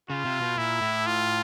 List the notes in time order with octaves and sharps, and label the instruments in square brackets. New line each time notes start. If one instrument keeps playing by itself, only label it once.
[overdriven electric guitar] C#3 [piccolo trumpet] F4
[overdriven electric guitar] C3
B2
[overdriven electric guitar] A#2 [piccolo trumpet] E4
[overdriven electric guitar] A2
[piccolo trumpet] F4